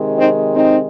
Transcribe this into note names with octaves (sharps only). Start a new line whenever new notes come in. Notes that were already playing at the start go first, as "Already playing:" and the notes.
Already playing: C3 D#3 G#3
C4 D#4
C4 D#4